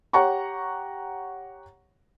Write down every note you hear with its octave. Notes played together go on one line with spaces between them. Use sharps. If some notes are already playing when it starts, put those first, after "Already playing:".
G4 C#5 F#5 A#5 C#6